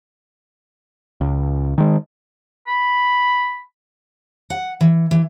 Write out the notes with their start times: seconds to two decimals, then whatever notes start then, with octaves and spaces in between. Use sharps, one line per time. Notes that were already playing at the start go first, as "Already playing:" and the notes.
1.21 C#2
1.78 D#3 G#3
2.67 B5
4.50 F#5
4.81 E3
5.11 E3